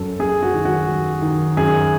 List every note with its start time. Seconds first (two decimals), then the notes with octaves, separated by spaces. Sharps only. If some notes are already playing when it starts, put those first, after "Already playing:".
Already playing: F#2 F#3 A4
0.19 F#2 G#4
0.43 F#4
0.54 D#3
0.65 F#4
0.88 F#3
1.22 D#3
1.57 F#2 G#4